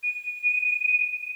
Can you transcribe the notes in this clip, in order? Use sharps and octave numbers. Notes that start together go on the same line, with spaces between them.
D#7